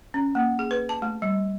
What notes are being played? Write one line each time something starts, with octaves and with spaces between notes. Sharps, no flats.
C#4
A#3
G#4
B4
A5
A3
G3